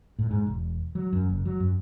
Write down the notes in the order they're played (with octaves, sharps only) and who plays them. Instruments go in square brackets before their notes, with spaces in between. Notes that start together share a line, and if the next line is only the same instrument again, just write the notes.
[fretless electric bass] A2
G#2
E1
F#3
F#2
F#1
F#3
F#2